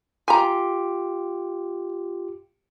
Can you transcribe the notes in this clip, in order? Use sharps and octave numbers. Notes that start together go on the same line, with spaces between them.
F4 G4 G#5 A#5